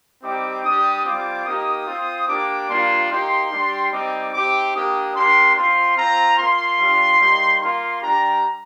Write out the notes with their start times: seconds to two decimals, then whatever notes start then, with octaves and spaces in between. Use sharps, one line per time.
0.23 G3 C4 D#4 G4 D6
0.64 G3 D4 G4 D#6
1.05 G3 C4 F4 D6
1.46 A#3 D#4 G4 D#6
1.87 C4 F4
2.28 A#3 D4 G4 D6
2.69 G3 A#3 D4 F4 C6
3.10 A#3 D#4 G4 C6
3.51 G3 D4 G4
3.92 G3 C4 D#4 D6
4.33 C4 D#4 G4 D6
4.74 A#3 D4 G4 D#6
5.15 A#3 D4 G4 C6
5.56 C4 F4 C6
5.97 C4 F4 A#5
6.38 A#3 F4 C6
6.80 G3 D4 F4
7.20 G3 A#3 D#4
7.61 A#3 F4 C6
8.02 G3 D4 G4 A#5